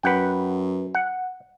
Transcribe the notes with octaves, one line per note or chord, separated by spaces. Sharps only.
F#2 B4 F#5 G5
F#5